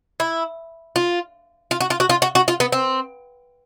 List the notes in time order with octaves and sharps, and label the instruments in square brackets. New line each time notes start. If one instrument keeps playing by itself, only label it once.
[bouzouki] E4
F4
F4
F#4
F4
F#4
F4
F#4
F#4
F4
B3
C4